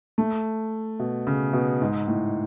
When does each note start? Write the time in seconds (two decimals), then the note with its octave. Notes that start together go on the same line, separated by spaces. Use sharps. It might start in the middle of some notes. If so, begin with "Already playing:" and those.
0.18 A3
0.99 B2
1.27 C#3
1.53 B2
1.82 G#2
2.08 A2